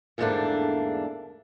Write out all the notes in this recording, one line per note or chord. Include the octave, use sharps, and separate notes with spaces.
E2 G#2 D3 A3 A#3 D4